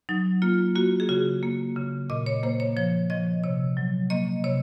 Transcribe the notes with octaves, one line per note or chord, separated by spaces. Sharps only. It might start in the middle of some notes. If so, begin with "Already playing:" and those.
F#3 D#4
A#3 F4
A#3 F#4
G#4
C#3 F#4
A#3
C#3
A#2 D#5
C#5
A#3 C5
C#5
F3 C#5
F3 D#5
C3 C#5
F#3
A#3 D#5
C3 C#5